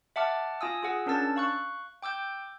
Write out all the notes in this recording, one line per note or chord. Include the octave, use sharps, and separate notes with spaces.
E5 F#5 A5 D6 F6
F4 F5 G#5 D#6 E6
F4 G#4 F#5 E6
C#4 D4 A#4 A5 E6 A6
F5 C#6 F#6
G5 D6 E6 G6